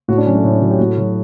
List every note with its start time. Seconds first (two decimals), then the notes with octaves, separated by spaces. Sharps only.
0.08 A2 F#4
0.18 D4
0.26 F#3 C#4
0.35 A3
0.44 A2
0.52 C#4
0.61 F#3
0.71 G4
0.79 A2 F#4
0.98 F#3